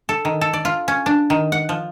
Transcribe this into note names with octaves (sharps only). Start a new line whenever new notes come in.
A4
D#3
A4
D5
F4
C#4
D4
D#3
F#5
F3